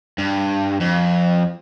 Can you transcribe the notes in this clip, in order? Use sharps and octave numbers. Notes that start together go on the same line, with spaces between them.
G2
F2